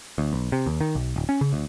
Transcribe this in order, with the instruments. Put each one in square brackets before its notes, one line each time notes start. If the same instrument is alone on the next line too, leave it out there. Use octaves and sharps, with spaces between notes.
[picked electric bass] D2
B1
C3
D#2
D#3
B1
D1
C#4
C#3
D2